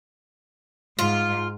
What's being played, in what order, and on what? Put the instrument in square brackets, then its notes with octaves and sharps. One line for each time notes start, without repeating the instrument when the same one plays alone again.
[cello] G#2 [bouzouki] F4